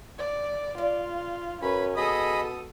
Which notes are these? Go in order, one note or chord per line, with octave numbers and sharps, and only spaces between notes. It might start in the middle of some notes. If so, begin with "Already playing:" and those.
D5
F4 D5
F#2 C#4 B4 B5
B2 G#4 A4 D#5 B5 D#6